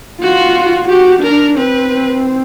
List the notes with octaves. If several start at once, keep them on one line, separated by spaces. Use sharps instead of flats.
F4 F#4
F#4 G4
D4 A#4
C4 B4